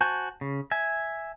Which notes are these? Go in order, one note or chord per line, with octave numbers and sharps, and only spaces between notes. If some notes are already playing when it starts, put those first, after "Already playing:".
F#4 C5 G#5 A5 G6
C#3
E5 G#5